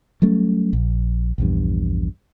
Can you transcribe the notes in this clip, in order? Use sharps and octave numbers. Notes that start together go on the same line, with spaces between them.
F#3 G3 A3 C#4
A#1
A#1 E2 G2